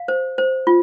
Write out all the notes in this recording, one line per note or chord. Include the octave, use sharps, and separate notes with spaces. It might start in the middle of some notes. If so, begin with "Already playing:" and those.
Already playing: F5
C5
C5
F4